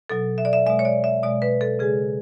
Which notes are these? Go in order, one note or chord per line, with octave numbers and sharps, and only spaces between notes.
B2 F#3 A4
E5
D5
E5
B2 G#3 E5
C#5
D5
E5
B2 G#3 D5
B4
A4
C#3 G#3 G#4